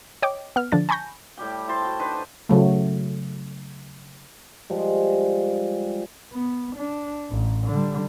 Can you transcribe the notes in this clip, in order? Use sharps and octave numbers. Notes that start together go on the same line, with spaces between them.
C#5 D#5 G5 D6
B3 F6
D3 F3 D4 A6
G#5 A5 B5 C#6 G6 A#6
A2 G3 G4 G5
E4 C5 A5 C6
F#4 G5
D4 D#4 B4 C5
C#3 F#3 A3
F3 G3 G#3
B3
D4
A1
D3 G3